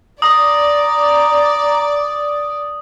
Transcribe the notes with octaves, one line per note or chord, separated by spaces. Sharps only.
D5 A#5 D#6